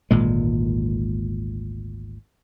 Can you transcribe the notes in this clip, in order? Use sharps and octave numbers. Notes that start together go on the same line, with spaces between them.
G#1 D2 A#2 G#3